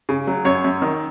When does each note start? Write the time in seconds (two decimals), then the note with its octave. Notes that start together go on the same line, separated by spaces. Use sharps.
0.09 C#3
0.27 F#3
0.45 F#2 C#5
0.64 F#2
0.82 D#3